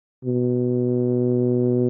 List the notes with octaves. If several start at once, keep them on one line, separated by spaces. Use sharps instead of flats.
B2